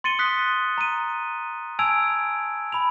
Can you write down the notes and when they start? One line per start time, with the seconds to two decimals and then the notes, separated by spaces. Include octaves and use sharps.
0.04 C6 A6 C#7 D#7 G7
0.19 D#6 F#6 B6
0.78 A#5 D#7
1.79 G#5 A5 E6 G#6 D7 F7
2.72 B5 F7